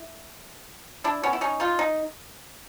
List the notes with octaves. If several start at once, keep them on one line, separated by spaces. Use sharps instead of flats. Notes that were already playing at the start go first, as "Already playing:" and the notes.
Already playing: E4
D4 E4
B3 C#4
E4
C#4 D#4
D#4 F4
D#4